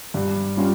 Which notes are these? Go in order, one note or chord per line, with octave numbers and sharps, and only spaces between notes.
G2
G3 C#4 F4